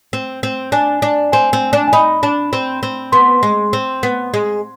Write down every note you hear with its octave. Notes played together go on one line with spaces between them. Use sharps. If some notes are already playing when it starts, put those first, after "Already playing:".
C4
C4
D4 G#5
D4
C4 G#5
C4
D4
G#5
D#4 B5
D4
C4
C4
B3 C6
G#3
C4
B3
G#3